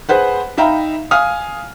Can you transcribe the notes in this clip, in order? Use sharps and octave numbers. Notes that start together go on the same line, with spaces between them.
G#4 B4 C5 F#5
D#4 E5 F5 G5 A#5 B5
F5 G#5 D#6 F6